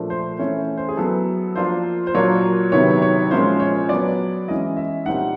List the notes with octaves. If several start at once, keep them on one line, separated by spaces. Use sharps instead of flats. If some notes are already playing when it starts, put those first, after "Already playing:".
Already playing: A#2 F3 A3 D4
C5
E3 A3 C#4 E4 C#5
C5
G#4
F#3 B3 E4 A4
F3 A#3 D4 F4 C5
C5
A#2 F#3 A#3 D4 F4 C#5
C3 D#3 F#3 B3 E4 C#5
C#5
A#2 F3 G#3 C#4 F4 C5
C#5
F#3 B3 D4 D5
E3 G#3 C#4 E4 D#5
E5
A#2 G3 C4 D#4 F#5